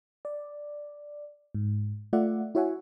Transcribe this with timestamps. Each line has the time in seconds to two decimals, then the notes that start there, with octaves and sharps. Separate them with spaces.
0.25 D5
1.55 G#2
2.13 A3 F4 D5 E5 F#5
2.55 E4 F#4 C#5 E5 F#5 G#5